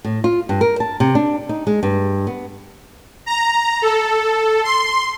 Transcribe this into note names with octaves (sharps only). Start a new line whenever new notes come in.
A2
F4
G2
A#4
A5
C3
D4
D#4
G#3
G2
B3
A#5
A4
C6